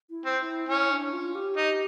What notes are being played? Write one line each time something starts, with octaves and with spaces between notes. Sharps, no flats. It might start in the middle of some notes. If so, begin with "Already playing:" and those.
E4
C4
E4
C#4 E4
D4
F4
G4
D#4